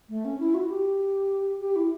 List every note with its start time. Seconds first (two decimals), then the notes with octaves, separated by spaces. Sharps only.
0.09 A3
0.25 C#4
0.40 E4
0.54 F#4
0.70 G4
1.61 G4
1.76 E4